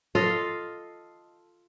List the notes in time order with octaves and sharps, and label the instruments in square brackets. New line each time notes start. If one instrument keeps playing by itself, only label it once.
[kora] F4 A4 D#5 F5